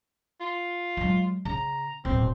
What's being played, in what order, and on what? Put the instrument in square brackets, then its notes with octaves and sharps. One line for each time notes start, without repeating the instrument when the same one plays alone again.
[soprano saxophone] F4
[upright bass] F#3 G#3
[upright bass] C#3 [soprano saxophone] A#5
[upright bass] D1 B2 [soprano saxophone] C4